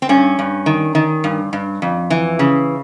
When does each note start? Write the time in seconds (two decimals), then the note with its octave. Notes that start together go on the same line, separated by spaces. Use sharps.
0.02 C4
0.09 G2 C#4
0.39 G2
0.66 D#3
0.95 D#3
1.24 G2
1.53 G2
1.82 F2
2.10 E3
2.39 C#3